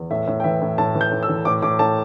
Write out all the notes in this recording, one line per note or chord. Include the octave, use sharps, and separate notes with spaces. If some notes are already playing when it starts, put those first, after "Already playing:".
Already playing: E2
A2 E5
A2
G5
E3 E5
A2
A2 A5
E3
G6
A2
E6
E3
A2 D6
A2 D6
A2 A5